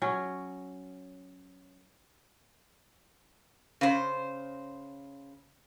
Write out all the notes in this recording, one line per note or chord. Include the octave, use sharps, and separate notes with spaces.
F#3 C#4
C#3 C5